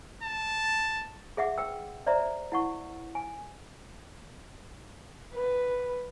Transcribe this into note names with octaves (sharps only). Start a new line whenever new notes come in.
A5
G#4 E5 F#5 D6
B4 G5 E6
C5 D5 E5 A#5
E4 F#5 C#6
G#5
B4